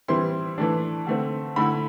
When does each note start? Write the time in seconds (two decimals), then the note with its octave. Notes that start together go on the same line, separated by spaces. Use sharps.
0.08 E3 G3 C4 E4 C6
0.58 E3 A3 D4
1.07 D3 A3 C4
1.56 D3 A3 E4 B5